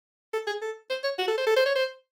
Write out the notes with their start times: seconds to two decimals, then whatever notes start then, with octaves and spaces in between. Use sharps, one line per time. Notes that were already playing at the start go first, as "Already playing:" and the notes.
0.33 A4
0.47 G#4
0.62 A4
0.90 C5
1.04 C#5
1.18 F#4
1.28 A4
1.37 C5
1.46 A4
1.56 C5
1.66 C#5
1.75 C5